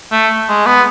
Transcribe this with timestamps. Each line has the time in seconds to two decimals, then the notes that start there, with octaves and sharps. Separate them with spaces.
0.12 A3
0.48 G#3
0.66 B3